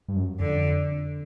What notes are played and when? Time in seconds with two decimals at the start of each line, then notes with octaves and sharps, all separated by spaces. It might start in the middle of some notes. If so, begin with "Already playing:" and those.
0.08 G2
0.16 F#2
0.40 F2 D3